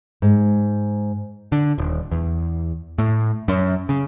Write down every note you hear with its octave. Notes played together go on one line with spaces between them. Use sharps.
G#2
D3
D#1
E2
A2
F#2
C#3